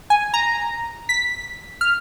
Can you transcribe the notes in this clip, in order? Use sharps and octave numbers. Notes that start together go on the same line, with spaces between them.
G#5
A#5
B6
F6